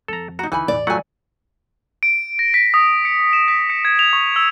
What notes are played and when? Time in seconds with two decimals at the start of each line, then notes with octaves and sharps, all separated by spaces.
0.08 F2 A4 A#5
0.39 D#4 F#4 A#5
0.52 D2 C#3 E3 D#4 G#5 B5
0.68 E2 A2 D5
0.87 F#3 A3 F4 F#5 G#5
2.03 D7
2.39 A#6
2.54 B6
2.74 D#6
3.05 C#7
3.33 E7
3.48 B6
3.70 C#7
3.85 G#6
3.99 F7
4.13 C#6
4.36 E6